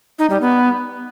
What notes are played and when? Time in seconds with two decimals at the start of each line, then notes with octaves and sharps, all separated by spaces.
0.19 D#4
0.30 G3
0.41 B3